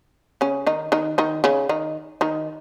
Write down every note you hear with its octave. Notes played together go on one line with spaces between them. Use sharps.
C#3 C#4
D#3 D#4
D#3 D#4
D#3 D#4
C#3 C#4
D#3 D#4
D#3 D#4